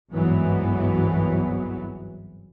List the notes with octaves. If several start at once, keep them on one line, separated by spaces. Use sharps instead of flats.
G1 C2 G#2 E3 F#3 B3